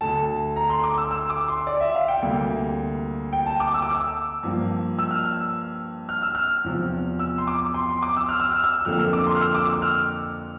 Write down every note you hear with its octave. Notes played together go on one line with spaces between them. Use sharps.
D2 D3 A3 A5
A#5
C6
D6
E6
E6
D6
C6
D5
E5
F5
G5
D2 C3 G3 A#3
G5
A5
D6
E6
D6
E6
G2 F3 A#3
E6
F6
E6
F6
E6
F6
E2 C3 F3
E6
C6
D6
C6
C6
D6
E6
F6
E6
F6
E6
F2 D3 F3 A#3 F6
E6
D6
C6
F6
E6
D6
E6
F6